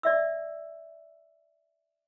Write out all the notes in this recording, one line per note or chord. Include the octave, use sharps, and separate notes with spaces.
D5 E5 E6